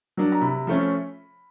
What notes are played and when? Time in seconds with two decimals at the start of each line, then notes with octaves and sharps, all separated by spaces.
0.17 F#3 A#3 D4
0.32 A#5
0.41 C3 B5
0.67 F3 A3 C#4